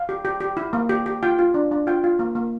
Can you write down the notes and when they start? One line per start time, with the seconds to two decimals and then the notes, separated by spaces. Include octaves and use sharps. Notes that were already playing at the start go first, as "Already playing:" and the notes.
Already playing: F5
0.09 G4
0.25 G4
0.40 G4
0.57 E4
0.73 A#3
0.89 G4
1.06 G4
1.23 F4 G5
1.39 F4
1.54 D4
1.71 D4
1.87 F4 G5
2.04 F4
2.19 A#3
2.35 A#3